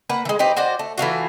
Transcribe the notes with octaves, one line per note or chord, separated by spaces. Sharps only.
A#3 B4 F#5
E3 G#3
D#4 G4 B4 C5
F#4 C5 D5 D#5
A3
E3 A3 F4 F#4